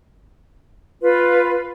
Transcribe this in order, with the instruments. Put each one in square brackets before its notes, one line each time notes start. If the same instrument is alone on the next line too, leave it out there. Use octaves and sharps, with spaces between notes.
[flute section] F4 B4